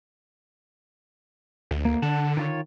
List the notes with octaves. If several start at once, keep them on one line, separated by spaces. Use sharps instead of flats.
D2
A#3
D3 F#5 A5
D#3 F4 C#5